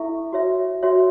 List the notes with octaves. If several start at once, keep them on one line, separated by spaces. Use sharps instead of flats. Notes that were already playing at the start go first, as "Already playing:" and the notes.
Already playing: E4 A4 E5 C#6
F#4 C#5 E5
F#4 C#5 E5